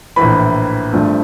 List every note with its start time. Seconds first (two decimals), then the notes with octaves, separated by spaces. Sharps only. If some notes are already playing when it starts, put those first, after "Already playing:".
0.16 A#1 A2 E3 B5
0.92 G#1 G2 D3 F3 A3